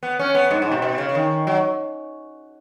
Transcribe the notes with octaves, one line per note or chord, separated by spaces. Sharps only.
B3
C#4
B3
G#2
G#2
B2
B2
C#3
C#3
D#3
F#3